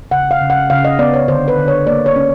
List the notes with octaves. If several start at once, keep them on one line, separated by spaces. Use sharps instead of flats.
C#3 F#5
F5
C#3
F#5
C#3 F5
D#5
B3 D5
C#5
D3 C5
B4
D3
C#5
A#3 D5
C#5
C#4